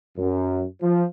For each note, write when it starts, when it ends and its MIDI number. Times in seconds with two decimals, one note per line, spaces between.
0.18 0.64 42
0.82 1.04 53